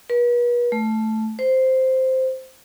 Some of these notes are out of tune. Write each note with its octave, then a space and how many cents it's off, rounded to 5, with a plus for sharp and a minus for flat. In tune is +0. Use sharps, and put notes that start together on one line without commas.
B4 -40
A3 -5
C5 -5